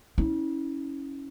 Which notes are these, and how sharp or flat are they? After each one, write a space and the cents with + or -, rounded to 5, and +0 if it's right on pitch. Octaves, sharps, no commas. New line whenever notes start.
C#4 +0 E4 -35